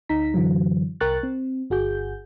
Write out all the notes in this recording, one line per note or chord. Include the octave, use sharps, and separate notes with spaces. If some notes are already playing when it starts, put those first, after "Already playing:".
D2 D#4 A#5 B6
F#2 D3 E3 F#3
C2 A#4 G5 C#6 F#6 A6
C4
G1 F#4 G#4 G6